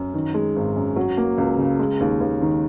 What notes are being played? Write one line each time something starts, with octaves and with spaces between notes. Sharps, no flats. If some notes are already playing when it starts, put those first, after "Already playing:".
Already playing: F#2
D#3
G#3
G#1
F#2
F#3
A#3
C#2
C#3
G#3
D#2
D#2
D#3